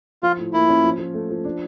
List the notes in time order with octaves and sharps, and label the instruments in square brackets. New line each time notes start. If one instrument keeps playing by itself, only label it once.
[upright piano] F3 [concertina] F4
[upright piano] A2
[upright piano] A#3 [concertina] E4
[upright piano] C#4
F3
F3
A3
F3
D4